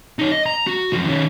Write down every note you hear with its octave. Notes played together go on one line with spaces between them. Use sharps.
D#4 C#5
D#5
A#5
F#4
F#2 F3
D#3 C#4